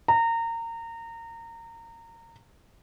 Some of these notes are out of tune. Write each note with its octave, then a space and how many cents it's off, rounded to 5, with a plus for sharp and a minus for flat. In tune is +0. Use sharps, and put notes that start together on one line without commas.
A#5 -25